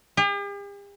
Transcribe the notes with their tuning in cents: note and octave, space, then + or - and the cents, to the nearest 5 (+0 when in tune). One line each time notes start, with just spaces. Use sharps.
G4 +45